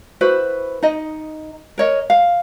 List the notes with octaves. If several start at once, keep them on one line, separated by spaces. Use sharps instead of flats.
E4 F#4 B4 C5
D#4 D#5
A#4 C#5 D#5
F5